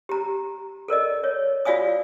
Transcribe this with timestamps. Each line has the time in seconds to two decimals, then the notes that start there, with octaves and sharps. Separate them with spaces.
0.09 G4 A#5
0.88 A4 A#4 D5 D#5
1.24 C#5
1.65 F4 F#4 D5 F5 G#5 D#6